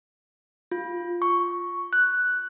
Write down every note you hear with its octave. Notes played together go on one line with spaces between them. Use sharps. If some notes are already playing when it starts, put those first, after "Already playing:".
F4
C#6
F#6